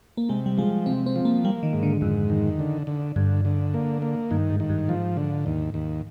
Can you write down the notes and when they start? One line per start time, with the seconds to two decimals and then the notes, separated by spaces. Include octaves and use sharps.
0.17 A#3
0.29 C3 G#3
0.46 G3
0.58 F3 G#3
0.86 C3 C4
1.06 C4
1.16 F3
1.25 A#3
1.45 G3 A#3
1.63 D#3
1.73 G#2
1.83 D3
2.01 F2 G#2
2.30 D#3
2.59 D3
2.87 D3
3.16 G2 D3
3.45 D3
3.74 A#3
4.02 A#3
4.31 G2 D#3
4.50 G#2
4.60 D#3
4.70 G2
4.88 G#2 F3
5.17 D3
5.46 D#2
5.74 D#2